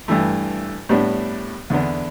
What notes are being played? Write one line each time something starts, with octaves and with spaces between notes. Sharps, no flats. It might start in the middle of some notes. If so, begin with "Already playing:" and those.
G2 E3 A3
A2 G3 B3 D4
E2 D3 B3 D4